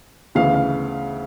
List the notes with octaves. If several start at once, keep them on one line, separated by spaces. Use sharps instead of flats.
D2 C#3 E3 F5
F5